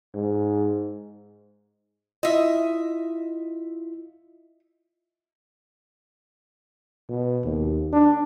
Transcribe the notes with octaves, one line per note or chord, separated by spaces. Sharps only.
G#2
E4 F4 D#5 E5
B2
D#2
D4